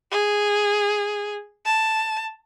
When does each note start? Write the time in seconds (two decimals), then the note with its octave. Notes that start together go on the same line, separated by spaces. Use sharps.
0.11 G#4
1.66 A5